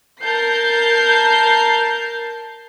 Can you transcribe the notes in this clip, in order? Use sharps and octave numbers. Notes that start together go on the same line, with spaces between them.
A#4 A5 G6 C7